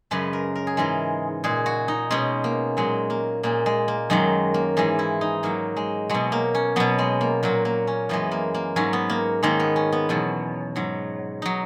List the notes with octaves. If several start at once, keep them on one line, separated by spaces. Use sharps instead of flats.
F#2 C#3 G#3 B4
A#4
A#4
G#4
G#2 E3 G#3 A#4
A#2 G#3 G#4
F#4
D#4
B2 G#3 C#4
A#3
A#2 F#3 G#3
A#3
A#2 G#3 A#3
G#3
A#3
F#2 D#3 F#3 G#3
A#3
G#2 E3 G#3
E4
D#4
G#2 F#3 A#3
G#3
B2 F#3 G#3
A#3
C#4
B2 F#3 B3
G#3
A#3
A#2 F#3 A#3
A#3
C#4
F#2 E3 G#3 B3
A#3
A#3
G#2 F#3 C#4
B3
A#3
G#2 D#3 G#3 A#3
B3
C#4
B3
E2 B2 F#3
G#2 F#3
F#3 D#4